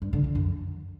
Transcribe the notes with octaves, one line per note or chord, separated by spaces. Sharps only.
G2
D3
D3
F#2